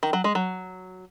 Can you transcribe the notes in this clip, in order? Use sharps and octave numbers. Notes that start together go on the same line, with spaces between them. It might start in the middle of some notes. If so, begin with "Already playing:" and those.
D#3
F#3
G#3
F#3